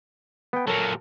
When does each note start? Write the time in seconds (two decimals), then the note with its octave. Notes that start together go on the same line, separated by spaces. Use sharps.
0.53 B3 G5
0.68 A#2 F#3 A4 A#4